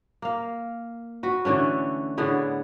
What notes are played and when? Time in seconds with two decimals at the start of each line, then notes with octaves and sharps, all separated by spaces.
0.22 A#3 F5
1.23 F#4 B4
1.45 D3 E3 A3 C#4
2.18 A2 D3 B3 G#4